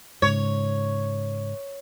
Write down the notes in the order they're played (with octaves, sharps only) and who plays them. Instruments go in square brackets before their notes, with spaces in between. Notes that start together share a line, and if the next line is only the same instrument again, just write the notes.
[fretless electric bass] G#2 C#3 [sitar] C#5